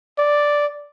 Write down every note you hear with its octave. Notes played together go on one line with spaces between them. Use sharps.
D5